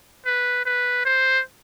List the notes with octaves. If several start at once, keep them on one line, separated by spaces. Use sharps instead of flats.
B4
B4
C5